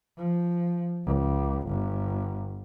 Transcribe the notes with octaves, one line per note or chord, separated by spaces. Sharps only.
F3
C#2
G1